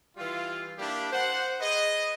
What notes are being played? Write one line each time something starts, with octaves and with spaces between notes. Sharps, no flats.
E3 G3 F4
G3 A#3 D4 E4 G4
C5 F#5
G#4 B4 D#5